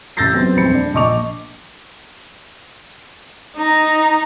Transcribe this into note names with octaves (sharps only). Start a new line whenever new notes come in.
A1 E6 G6 A6 A#6 C7
F#2 B3 C4
D#1 F2 G3 C4 B5 C#7
D4
A#1 D#5 C#6 D6 F7
D#4